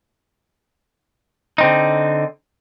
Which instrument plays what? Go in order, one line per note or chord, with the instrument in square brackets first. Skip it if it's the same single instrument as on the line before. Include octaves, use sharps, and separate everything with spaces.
[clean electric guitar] D3 C4 D#4